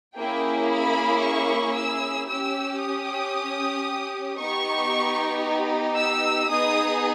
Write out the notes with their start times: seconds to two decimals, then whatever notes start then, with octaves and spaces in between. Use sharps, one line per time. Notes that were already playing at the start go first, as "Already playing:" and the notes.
0.17 A#3 C#4 E4 G#4 G5
0.70 B5
1.22 C#6
1.76 E6
2.28 C#4 G4 E6
2.81 D#6
4.39 B3 D#4 G4 C#6
5.96 E6
6.49 B3 D#4 G#4 D#6